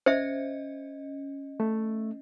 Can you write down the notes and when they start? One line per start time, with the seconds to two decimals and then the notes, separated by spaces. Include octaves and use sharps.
0.06 C#4 C5 D#5 E5
1.60 A3